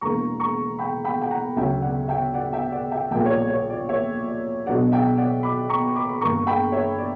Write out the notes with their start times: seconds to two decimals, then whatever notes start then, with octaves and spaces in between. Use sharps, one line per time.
0.01 E1 E2 D3 A#3 A#5 C#6
0.40 A#5 C#6
0.79 G5 B5
1.05 G5 B5
1.21 G5
1.31 F#5 A#5
1.56 D2 C#3 F#3 C#4 E5 G5
1.82 D5 F#5
2.08 E5 G5
2.34 D5 F#5
2.53 E5 G5
2.72 D5 F#5
2.91 E5 G5
3.11 A#1 A#2 G3 A#3 E5 G5
3.26 C#5
3.30 D5
3.50 C#5
3.70 D5
3.89 C#5 E5
4.27 D5
4.66 B1 B2 F#3 B3 D4 D5 F#5
4.91 E5 G5
5.17 D5 F#5
5.43 B5 D6
5.69 A#5 C#6
5.95 B5 D6
6.09 B5
6.21 G2 D3 A#3 D4 A#5 C#6
6.47 G5 B5
6.72 C#5 E5
6.98 D5